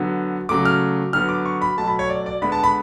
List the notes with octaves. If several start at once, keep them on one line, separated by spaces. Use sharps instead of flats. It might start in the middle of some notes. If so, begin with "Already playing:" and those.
Already playing: D3 F#3 B3
C#3 F#3 A3 D6
F6
D3 F#3 B3 F6
D6
C#6
B5
B2 F#3 A3 A5
B5
C#5
D5
D5
D3 G#3 B3 B5
A5
B5